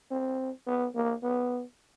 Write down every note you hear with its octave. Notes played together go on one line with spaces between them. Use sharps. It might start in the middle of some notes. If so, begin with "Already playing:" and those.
C4
B3
A#3
B3